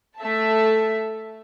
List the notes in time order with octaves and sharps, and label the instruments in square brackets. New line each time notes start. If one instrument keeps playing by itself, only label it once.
[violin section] A3 E5 A5